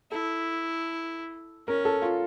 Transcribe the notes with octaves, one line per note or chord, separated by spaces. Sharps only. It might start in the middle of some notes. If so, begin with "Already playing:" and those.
E4 A4
C#4 A#4
A4
F4